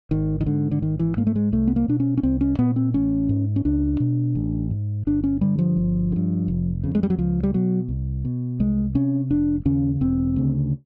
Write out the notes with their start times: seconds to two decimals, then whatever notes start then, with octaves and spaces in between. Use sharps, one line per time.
0.11 G#1 D#3
0.41 D#3
0.46 G#2 D3
0.71 D3
0.82 G#1 D#3
0.99 E3
1.17 G#2 A#3
1.27 A3
1.36 G#3
1.52 C2 A3
1.67 B3
1.76 A#3
1.88 B2 D4
2.00 C#4
2.17 C#4
2.23 C2 C4
2.41 C#4
2.58 A#2 B3
2.76 C4
2.94 A1 C#4
3.29 G#2
3.56 C#4
3.65 C#2 D4
4.00 B2
4.35 A1
4.71 G#2
5.07 G1 D4
5.24 C#4
5.41 G2 D3 G3
5.59 F3
5.77 G1
6.12 D3
6.16 G2
6.48 F1
6.83 F2 C#3
6.95 G#3
7.03 G3
7.10 F#3
7.18 C#2 F3
7.43 G3
7.54 B2 F#3
7.88 C2
8.25 B2
8.60 C2 G#3
8.95 C3 C#4
9.31 F1 D4
9.65 D#2 C#3 C#4
10.01 E1 C4
10.36 D2 C#3